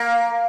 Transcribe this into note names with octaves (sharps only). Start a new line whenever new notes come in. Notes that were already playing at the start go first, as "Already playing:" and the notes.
Already playing: A#3